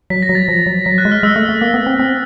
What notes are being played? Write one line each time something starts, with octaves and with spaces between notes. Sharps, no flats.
F#3 B6
A#6
F#3
A6
F3
F#3
F#3 B6
F#6
G#3
F6
G#3 E6
A3
A3
A#3
B3
C4
C4